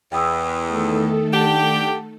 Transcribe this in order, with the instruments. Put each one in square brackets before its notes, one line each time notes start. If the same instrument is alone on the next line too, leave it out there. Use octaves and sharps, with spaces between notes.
[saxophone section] E2 [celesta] G5 D#6 E6
[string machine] D#3 A3 A4
[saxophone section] D4 G4 [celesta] F#5 A5